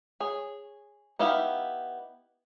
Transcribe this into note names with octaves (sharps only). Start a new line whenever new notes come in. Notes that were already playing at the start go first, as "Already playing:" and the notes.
G#4 C#5
B3 D#4 E4 G4 F5